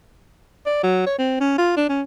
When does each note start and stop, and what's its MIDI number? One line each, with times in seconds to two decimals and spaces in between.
0.66 0.80 74
0.83 1.03 54
1.06 1.14 73
1.18 1.39 60
1.40 1.55 61
1.58 1.72 65
1.77 1.88 62
1.89 2.02 61